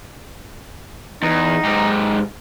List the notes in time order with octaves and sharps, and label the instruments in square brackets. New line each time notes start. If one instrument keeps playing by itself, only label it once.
[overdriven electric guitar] E2 [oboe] D#4
[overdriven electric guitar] G#2 G4